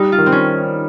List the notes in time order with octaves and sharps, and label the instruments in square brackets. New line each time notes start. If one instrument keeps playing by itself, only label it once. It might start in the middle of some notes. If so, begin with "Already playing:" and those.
Already playing: [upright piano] G3 [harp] D#4
[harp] F4
[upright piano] D#3
[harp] C4
C#4